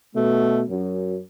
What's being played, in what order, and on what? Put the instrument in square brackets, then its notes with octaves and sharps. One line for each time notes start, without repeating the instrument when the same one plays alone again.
[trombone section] B2 [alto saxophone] A3
[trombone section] F#2